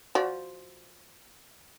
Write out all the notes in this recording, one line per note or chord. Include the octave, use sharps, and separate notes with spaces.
F3 F#4 D5